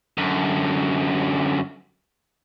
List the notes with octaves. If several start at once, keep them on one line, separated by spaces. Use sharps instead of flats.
F#2 D3